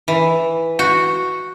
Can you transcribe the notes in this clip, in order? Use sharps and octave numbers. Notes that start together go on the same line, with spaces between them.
E3
F#4